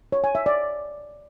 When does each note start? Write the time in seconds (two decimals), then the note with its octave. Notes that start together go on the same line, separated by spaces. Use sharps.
0.12 C#5
0.24 G#5
0.35 E5
0.46 D5